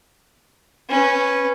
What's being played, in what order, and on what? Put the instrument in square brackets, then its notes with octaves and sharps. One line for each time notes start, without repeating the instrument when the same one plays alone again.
[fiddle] C#4 B4